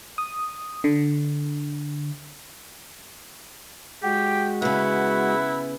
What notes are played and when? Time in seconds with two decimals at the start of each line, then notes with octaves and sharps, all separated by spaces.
0.18 D#6
0.84 D3
4.03 G#3 F#4 G4 G5
4.62 C#3 B3 E4 F#5